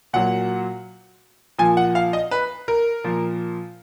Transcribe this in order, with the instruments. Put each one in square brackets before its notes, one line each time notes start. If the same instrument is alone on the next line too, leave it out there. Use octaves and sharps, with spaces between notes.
[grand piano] A#2 F#3 F#5
A#2 F3 G#5
F#5
F5
D#5
B4
A#4
A#2 F3